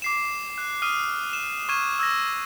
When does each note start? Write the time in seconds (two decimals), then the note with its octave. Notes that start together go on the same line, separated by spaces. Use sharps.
0.02 D6 C7 E7
0.58 F#6
0.82 D#6 F6 D#7
1.33 E7
1.69 C#6 F6 G#6 D#7 E7
1.99 E6 G#6 A#6